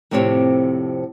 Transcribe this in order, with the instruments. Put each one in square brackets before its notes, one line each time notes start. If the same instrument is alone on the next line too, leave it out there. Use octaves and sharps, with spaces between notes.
[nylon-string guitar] F2 A2 C3 C4 G4 C#5